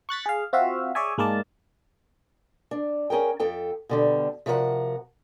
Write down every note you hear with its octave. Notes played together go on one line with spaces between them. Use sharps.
C#6 F#6 A6 B6
G#4 F5
C4 F4 F#4 E5 F5
G#4 C#5 D5 E5 G#5
G#2 G#3 A#3 A#4 D5 A5
D4
C#4 G#4 A#4 G5
F2 A4 G5
B2 D3 G3
C3 F3 F#4 A#4 C5 F#5